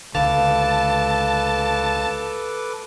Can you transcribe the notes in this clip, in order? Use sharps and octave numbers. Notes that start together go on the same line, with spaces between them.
C#2 D3 A4 B4 F5 A5 D6